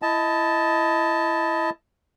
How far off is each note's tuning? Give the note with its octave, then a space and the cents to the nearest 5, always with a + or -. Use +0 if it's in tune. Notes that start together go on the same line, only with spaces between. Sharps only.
E4 +20 D#5 +20 A5 +0